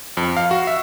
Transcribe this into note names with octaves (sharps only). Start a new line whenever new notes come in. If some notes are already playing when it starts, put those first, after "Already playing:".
F2
F5
F#4
E5